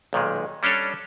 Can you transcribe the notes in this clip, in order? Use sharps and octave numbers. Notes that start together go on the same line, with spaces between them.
B1 A#2 D#3 G#3
G3 C#4 D4 A4 C#5